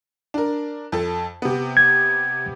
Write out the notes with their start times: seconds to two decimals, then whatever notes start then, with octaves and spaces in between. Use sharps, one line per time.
0.34 D4 A#4
0.92 F2 A4
1.42 C3 B3
1.77 G#6